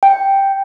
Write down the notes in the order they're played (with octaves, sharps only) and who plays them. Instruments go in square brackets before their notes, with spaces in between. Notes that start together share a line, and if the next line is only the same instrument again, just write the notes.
[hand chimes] G5